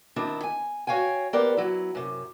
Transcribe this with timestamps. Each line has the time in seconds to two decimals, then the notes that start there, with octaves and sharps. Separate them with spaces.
0.16 D#3 C4 D4 E4
0.43 G#5
0.87 F#4 C#5 F5 G5 G#5
1.33 B3 G4 A#4 C5 D5
1.57 F#3 E4
1.95 F#2 C3